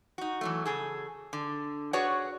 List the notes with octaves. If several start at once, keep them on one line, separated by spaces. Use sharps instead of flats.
D#4 F#4
E3 F#3 A3
C#3 G#4 A4
D3
F#4 G#4 B4 C#5 D5 F#5